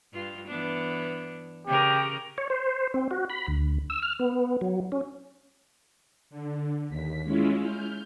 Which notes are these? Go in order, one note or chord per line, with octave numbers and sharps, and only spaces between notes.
G2 F4
E3 B3 D4
C#3 C#4 G4 A#4
C#5
C5
C4
F#4
B5
D2
E6
F6
B3
F#3
C#4
D3
D#2 B6
G#3 C#4 E4 F4
F6 G6